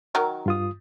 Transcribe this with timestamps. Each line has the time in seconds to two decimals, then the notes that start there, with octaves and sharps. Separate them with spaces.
0.15 D#3 F#3 A#4
0.46 G2 F4 D#6